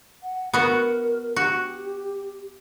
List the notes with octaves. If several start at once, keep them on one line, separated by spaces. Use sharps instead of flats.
F#5
B3 F#4 A#4
F#4 G4